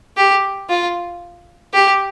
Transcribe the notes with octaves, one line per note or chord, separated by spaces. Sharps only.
G4
F4
G4